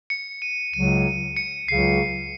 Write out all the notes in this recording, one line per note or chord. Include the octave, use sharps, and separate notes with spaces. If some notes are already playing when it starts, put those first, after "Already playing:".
C#7
D#7
C#2 C#3 F#3 D#7
C#7
C#2 C#3 F#3 C7